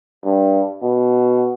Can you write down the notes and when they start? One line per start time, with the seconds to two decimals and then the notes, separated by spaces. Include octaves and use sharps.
0.25 G2
0.83 B2